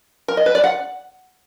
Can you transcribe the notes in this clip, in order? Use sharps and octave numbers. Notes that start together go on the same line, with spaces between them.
A#4
D#5
B4
D5
F#5